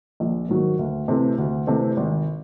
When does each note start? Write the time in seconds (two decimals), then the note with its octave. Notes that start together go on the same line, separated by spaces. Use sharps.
0.20 A#1
0.49 G#2 D#3 F#3
0.79 D2
1.08 C3 E3 A3 C4
1.38 D2
1.67 C3 E3 A3 C4
1.97 G#1